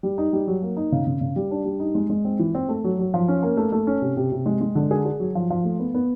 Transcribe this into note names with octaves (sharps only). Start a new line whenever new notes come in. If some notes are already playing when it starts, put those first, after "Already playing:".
G3
D#4
G3
F#3
A#3
D#4
C#3
C#3
C#3
G3
D4
G3
D#4
G#3
G#3
C4
E3
C4
A3
F#3
F#3
F3
C#4
A#3
A3
A3
C#4
C3
C3
C3
G#3
G#3
D3
G#4
G#4
F#3
F3
F3
A3
B3
B3